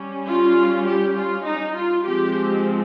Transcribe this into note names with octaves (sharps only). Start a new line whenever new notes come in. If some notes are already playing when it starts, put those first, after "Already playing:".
Already playing: G3 C#4
F4
G4
F4
D#4
F4
F3 G#3 C4 G4